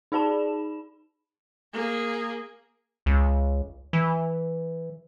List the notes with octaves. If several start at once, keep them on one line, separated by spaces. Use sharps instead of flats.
D#4 G#4 D5 A5 B5 E7
A#3 G#4
C#2
E3